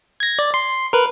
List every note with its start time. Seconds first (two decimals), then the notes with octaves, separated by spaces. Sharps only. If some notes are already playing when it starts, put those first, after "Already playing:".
0.20 G#6 A#6
0.39 D5
0.54 C6
0.93 A#4 B4